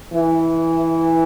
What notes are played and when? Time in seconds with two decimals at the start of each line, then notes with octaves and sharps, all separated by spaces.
0.13 E3